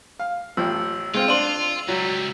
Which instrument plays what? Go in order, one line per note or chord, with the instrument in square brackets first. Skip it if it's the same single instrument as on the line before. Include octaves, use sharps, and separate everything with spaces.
[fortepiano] F5
[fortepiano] A1 F3 G5 [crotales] E6
[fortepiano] G#3 C4 F5 [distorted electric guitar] F4
[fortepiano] D4 C5 [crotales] D#7 F#7
[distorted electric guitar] C#2 G3 [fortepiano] F#3